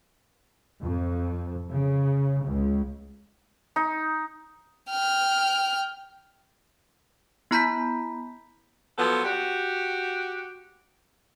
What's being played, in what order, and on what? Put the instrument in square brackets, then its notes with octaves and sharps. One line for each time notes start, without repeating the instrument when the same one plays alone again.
[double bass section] F2
C#3
C#2
[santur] D#4
[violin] G5 F6
[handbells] B3 E4 A#5 B5 G6 B6
[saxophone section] F3 F#3 B3 A4
F#4 G4